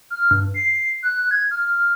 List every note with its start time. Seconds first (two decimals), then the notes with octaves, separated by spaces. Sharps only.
0.10 F6
0.31 G2
0.54 C7
1.03 F#6
1.31 G#6
1.51 F6